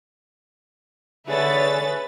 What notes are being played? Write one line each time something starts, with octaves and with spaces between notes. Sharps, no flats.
D3 G#4 B4 C#5 E5 A6